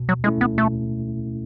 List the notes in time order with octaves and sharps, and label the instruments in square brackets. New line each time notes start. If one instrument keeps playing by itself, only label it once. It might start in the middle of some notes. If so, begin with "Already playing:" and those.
Already playing: [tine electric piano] B2
[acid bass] F#3
[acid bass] G#3 [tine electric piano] A3 C#4 E4
[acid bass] B3
[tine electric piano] B2 [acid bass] A3